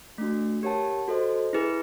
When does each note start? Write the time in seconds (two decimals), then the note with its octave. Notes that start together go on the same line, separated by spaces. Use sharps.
0.18 A3 D4 F#4
0.63 G4 A#4 C#5 F#5 A5
1.08 F#4 A4 C5 D#5
1.53 E4 G#4 B4